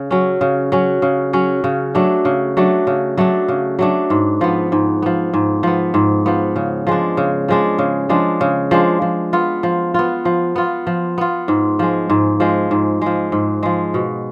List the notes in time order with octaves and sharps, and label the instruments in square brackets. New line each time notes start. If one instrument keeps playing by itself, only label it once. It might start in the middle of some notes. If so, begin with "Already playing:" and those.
Already playing: [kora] C#3
F#3 C#4
C#3
F#3 C#4
C#3
F#3 C#4
C#3
F#3 A3 D4
C#3
F#3 A3 D4
C#3
F#3 A3 D4
C#3
F#3 A3 D4
G#2
F3 B3
G#2
F3 B3
G#2
F3 B3
G#2
F3 B3
C#3
F3 G#3 D4
C#3
F3 G#3 D4
C#3
F3 G#3 D4
C#3
F3 G#3 D4
F3
B3 F4
F3
B3 F4
F3
B3 F4
F3
B3 F4
G#2
F3 G#3
G#2
F3 G#3
G#2
F3 G#3
G#2
F3 G#3
B2